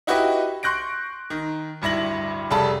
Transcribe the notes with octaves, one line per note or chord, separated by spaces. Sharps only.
D#4 E4 F#4 G4 B4 D#5
C6 C#6 F#6 G6 A#6 D7
D#3
D1 G2 E4 A#6 F#7
F1 C#3 G3 A4 A5 B5